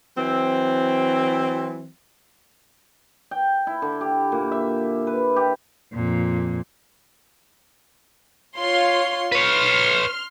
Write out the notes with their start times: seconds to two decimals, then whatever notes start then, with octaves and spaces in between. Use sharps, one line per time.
0.17 E3 F#3 C4
3.31 G5
3.67 E4
3.82 D3
4.01 G4
4.32 A#2
4.52 E5
5.07 B4
5.36 G4
5.93 F2 A#2
8.57 F4 C#5 C6
9.32 B4 C#5 C6 F6